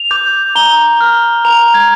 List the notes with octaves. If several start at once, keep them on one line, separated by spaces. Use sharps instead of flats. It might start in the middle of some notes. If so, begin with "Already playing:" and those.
Already playing: F7
D6 G6
A#5 G7
F6
A#5 F7
G#6